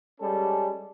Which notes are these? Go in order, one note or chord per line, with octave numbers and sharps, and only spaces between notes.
G3 G#3 C#4 A4